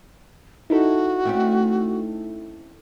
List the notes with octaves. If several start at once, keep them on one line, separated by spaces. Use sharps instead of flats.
D#4 E4 F#4 A4
A3 C4 C#4